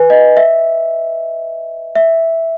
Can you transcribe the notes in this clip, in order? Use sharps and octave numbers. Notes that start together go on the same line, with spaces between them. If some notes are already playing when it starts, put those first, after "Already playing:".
Already playing: B4 G#5
D#5
E5
E5